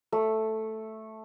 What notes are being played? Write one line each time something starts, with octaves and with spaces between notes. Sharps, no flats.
A3